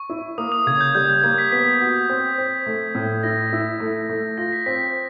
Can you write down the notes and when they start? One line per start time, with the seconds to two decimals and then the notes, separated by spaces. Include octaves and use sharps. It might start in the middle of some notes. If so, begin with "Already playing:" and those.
Already playing: C#6
0.10 E4
0.38 A#3 D#6
0.52 D#6
0.67 C#3 G#6
0.81 G6
0.95 G3 G6
1.10 G#6
1.24 A#3 G#6
1.38 B6
1.52 B3 B6
1.81 F#4
2.09 C4
2.38 C4
2.66 A3
2.95 A2
3.23 E4 A#6
3.53 E4
3.80 A3
4.10 A3
4.38 F4 A#6
4.53 B6
4.66 C4 B6